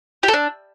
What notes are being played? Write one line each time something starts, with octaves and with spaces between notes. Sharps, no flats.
G4
A4
D4